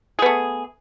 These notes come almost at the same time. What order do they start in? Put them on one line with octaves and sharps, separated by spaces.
G#4 B3 A3